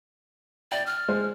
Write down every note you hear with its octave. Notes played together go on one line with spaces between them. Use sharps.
D5 G5
F6
G#3 C5